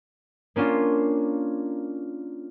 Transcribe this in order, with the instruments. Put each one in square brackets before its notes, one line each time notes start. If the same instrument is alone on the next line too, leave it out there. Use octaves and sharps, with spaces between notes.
[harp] A#3 C#4 D4 F4